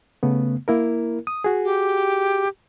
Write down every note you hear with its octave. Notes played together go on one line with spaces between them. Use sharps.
C#3 A3 B3
A#3 E4 A#4
D#6
F#4 G#4
G4